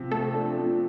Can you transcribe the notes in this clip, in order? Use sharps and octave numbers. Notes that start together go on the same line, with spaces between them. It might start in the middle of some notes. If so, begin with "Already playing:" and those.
Already playing: C3 F3
A3 A4
D4
F3